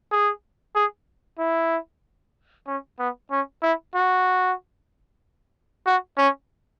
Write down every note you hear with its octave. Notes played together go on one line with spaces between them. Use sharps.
G#4
G#4
E4
C#4
B3
C#4
E4
F#4
F#4
C#4